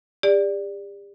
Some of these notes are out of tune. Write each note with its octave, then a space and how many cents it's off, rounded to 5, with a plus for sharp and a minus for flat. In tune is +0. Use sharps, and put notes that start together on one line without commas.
G4 +40 D5 +0